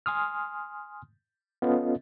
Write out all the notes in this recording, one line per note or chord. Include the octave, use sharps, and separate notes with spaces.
G#5 C6 D#6 F6
B3 C#4 F4 A4 D#5